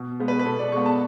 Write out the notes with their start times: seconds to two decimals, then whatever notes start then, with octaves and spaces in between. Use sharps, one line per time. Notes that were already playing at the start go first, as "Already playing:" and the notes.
Already playing: B2
0.20 G#3 B3
0.28 B4
0.39 B4
0.45 B2 A4
0.59 D5
0.72 G#3 B3 C#6
0.86 A5